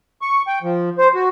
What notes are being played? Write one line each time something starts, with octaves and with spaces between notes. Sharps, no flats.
C#6
G5
F3
C5
F#4